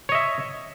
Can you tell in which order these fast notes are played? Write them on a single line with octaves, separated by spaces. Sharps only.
C#5 D#5 E5